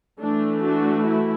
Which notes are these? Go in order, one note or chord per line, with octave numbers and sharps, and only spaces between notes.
E3 A3 D4
D4 F#4
E4